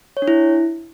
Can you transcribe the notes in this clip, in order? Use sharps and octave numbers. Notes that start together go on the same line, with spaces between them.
C#5
D4
E4